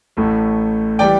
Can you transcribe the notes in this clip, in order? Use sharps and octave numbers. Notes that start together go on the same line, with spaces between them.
A1 A2 A3
E3 G3 D5 G5